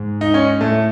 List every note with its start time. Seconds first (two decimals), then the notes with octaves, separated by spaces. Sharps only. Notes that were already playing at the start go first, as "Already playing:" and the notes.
Already playing: G#2
0.21 D#4
0.34 C#4
0.61 A2 A3